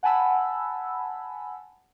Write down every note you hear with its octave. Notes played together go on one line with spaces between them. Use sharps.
F#5 G#5 A5 B5 E6